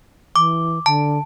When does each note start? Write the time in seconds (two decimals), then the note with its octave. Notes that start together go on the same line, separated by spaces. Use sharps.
0.36 E3 D6
0.86 D3 A5